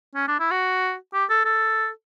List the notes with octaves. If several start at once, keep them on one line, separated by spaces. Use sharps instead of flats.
C#4
D4
E4
F#4
G4
A4
A4